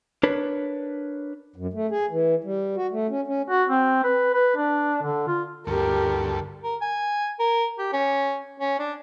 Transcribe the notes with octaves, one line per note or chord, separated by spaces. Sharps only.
D4 A#4 B4 C#5
F#2
A3
G#4
E3
G3
F#4
A3
C#4
C#4
F#4
C4
B4
B4
D4
D3
F4
D2 G2 G4 A4 A#4
A#4
G#5
A#4
G4
C#4
C#4
D4